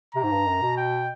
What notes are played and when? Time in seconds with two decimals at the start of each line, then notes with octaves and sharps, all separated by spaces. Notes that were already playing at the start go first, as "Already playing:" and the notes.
0.15 C3 A#5
0.23 G#2
0.31 G2
0.47 F#2
0.62 B2
0.77 G5